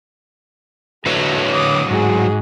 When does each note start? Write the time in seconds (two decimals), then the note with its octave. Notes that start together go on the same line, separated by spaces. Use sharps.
1.06 A2 D3 F#3 A3 B4 C#5
1.51 D6 D#6
1.91 G#2 F#4 G#4